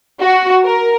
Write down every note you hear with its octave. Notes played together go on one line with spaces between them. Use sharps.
F#4
A#4